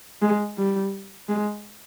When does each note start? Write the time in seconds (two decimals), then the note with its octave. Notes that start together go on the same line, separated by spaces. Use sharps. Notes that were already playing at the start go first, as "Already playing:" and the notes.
0.22 G#3
0.58 G3
1.29 G#3